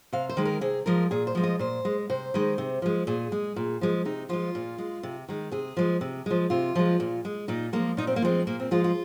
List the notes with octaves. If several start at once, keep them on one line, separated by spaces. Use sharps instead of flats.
C3 F5
C5
D#3 G#3
A#4
C3 G#4
F3 G#3 A#4
A#2 G#4
C5
F3 G#3
D#5
A#2 C5
G#3
C3 C5
D#3 G#3
C3
F3 G#3
A#2 G#4
G#3
A#2
F3 G#3
C3 D#4
F3 G#3 F4
A#2
G#3
C3
D#3 G#3
C3 G#4
F3 G#3
C3
F3 G#3
C3 F4
F3 G#3
A#2
G#3
A#2 D#4
F3 G#3 A#3
A#2 D#4
C4
A#3
F3 G#3 C4
A#2 A#3
C4
F3 G#3 F4
F4